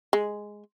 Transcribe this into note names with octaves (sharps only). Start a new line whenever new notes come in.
G#3